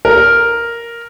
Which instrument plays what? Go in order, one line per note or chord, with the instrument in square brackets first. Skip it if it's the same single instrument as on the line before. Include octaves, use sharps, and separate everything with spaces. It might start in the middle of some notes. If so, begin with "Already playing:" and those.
[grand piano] A#4